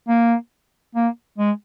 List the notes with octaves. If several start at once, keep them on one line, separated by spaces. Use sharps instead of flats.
A#3
A#3
G#3